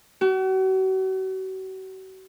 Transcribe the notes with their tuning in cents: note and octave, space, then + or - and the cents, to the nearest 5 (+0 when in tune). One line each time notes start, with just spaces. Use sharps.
F#4 +40